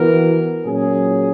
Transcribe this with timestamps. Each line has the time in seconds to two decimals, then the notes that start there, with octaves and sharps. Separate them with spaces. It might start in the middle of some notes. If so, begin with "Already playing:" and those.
Already playing: E3 B3 F#4 A#4
0.63 A#2 F#3 C#4 G#4